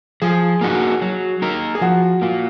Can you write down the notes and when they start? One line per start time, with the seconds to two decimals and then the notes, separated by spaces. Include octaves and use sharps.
0.22 F3 G#4
0.61 A#3 D#4 F#4
1.02 F#3
1.42 A#3 D#4 A#4
1.75 G#4
1.81 F3 F#4
2.22 A#3 F4